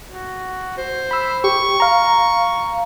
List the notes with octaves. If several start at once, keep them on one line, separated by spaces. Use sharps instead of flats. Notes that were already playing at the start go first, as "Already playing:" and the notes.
F#4
C5
B5 E6
G4 C#6
F5 A#5